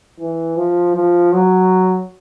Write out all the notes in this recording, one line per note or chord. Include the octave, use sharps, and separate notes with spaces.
E3
F3
F3
F#3